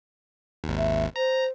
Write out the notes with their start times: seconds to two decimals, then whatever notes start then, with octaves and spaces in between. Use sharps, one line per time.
0.64 G#1 D#2
0.77 E5
1.16 C5 A#5